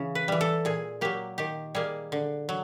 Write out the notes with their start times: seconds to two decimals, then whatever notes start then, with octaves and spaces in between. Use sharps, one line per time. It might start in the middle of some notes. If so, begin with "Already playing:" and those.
Already playing: C#3 E3
0.15 B4
0.28 E3 G3
0.41 A4
0.65 A#2 G#4
1.01 F#3 A#3 G4
1.38 D#3 G4
1.75 G3 A#3 G#4
2.12 D3
2.49 F#3